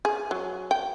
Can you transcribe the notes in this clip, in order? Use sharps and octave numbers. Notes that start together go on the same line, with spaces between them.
G#4
F#3
G5